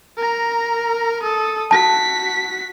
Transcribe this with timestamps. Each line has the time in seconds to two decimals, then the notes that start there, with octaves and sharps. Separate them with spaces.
0.17 A#4 A#5
1.22 A4 D#6
1.71 F#4 A5 B6